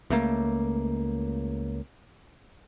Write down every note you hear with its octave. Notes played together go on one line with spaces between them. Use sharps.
C#2 A3 A#3